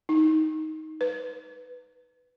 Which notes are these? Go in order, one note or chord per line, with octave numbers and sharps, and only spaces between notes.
D#4
B4